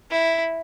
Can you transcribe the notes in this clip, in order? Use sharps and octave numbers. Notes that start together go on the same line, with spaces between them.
E4